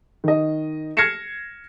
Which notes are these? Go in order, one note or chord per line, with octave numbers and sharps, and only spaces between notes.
D#3 D#5
F6 G#6 A#6 C7 C#7 E7